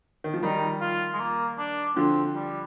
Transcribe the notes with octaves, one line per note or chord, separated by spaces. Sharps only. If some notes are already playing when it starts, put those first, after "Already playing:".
D#3
F3
D#3 G3 D#4
F4
G#3
A#3
D4
D3 F3 C4
G3